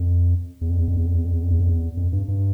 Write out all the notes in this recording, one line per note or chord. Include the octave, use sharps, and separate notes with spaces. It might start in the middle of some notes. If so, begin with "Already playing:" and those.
Already playing: F2
E2
F2
E2
F2
E2
F2
E2
F2
E2
F2
E2
F2
E2
F2
G2
G2